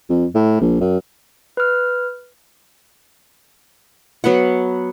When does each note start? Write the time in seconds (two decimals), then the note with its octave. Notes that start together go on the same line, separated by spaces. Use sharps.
0.10 F2
0.35 A2
0.61 A#1
0.81 F#2
1.57 B4 F6
4.24 F#3 B3 B4 F#5